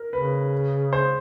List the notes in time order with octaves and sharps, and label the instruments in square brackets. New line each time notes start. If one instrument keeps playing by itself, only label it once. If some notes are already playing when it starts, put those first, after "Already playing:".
Already playing: [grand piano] A#4
[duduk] C#3 [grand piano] B4
[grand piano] C5